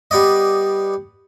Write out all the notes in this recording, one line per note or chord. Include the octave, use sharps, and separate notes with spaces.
G3 B3 D5 D#5